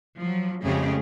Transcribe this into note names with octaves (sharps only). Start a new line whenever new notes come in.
F3 F#3
F2 C#3 G#3 A3 G4 G#4